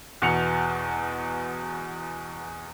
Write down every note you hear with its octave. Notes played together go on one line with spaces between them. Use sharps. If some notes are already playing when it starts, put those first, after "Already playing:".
E2 B2 F#5 C#7 F7